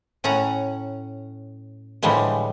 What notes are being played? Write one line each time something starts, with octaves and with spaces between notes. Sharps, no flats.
A2 C#4 F#5 A#5
A2 D3 E3 F3 G3 G#3